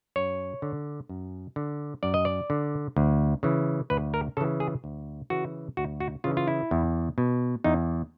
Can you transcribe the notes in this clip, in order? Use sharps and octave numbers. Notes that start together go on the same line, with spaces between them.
F#2 C#5
D3
F#2
D3
F#2 D5
D#5
D5
D3
D2
C#3 E3
D2 B4
A#4
C#3 E3 A4
G#4
D2
C#3 E3 F#4
D2 F#4
F#4
C#3 E3 F4
F4
E4
E2
B2
E2 D#4